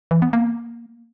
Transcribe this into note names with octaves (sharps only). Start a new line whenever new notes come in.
E3
B3
A#3